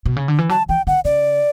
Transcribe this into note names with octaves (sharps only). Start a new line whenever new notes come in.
B2
C#3
D3
E3
F#3 A5
E3 G5
D3 F#5
C#3 D5